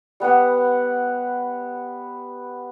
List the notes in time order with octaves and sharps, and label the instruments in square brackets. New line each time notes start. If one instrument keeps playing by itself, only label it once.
[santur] G3 B3 B4 F#5